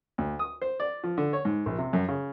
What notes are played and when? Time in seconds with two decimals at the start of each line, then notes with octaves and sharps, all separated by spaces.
0.18 D2
0.39 D#6
0.62 C5
0.80 D5
1.04 F3
1.18 D3
1.33 C#5
1.45 G#2
1.66 A#1
1.78 C3
1.93 F#2
2.09 C#3